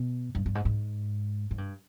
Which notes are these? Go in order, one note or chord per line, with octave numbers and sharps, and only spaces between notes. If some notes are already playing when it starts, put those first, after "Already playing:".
Already playing: B2
G2
G2
G#2
G#2
G#2
G2